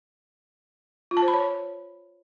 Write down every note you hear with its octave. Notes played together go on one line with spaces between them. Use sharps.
F4
A5
C5
B5
C#5